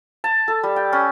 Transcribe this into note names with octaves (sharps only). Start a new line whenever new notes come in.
A5
A4
G3
G5
C#4